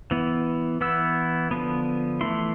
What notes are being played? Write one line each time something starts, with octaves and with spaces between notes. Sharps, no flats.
E3 B3 E4
E3 B3 E4 E6
D3 F3 B3
E3 A3 E4 C6